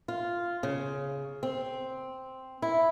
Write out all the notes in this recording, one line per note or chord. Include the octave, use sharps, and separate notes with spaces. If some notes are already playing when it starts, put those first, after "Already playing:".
F4
C#3
C4
E4